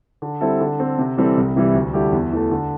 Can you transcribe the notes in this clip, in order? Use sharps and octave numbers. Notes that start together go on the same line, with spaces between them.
D3
G3 C4 E4 A4
D3
C4 A4
C3
E3 G3 C4 A4
C2
C3 E3 G3 E4
D2
D3 G3 E4 G4
E2
E3 A3
D3